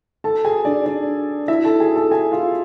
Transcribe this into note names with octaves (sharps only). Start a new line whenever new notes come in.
A4 A5
G#4 G#5
D4 D5
D4 D5
E4 E5
A4 A5
G#4 G#5
A4 A5
G#4 G#5
F4 F5